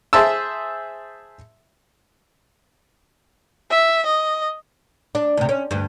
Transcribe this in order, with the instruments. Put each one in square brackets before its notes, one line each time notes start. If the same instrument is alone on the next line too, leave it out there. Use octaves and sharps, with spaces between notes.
[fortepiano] G#4 C5 E5 A5 E6
[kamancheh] E5
D#5
[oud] D4
D2 C3
C#4
D2 G2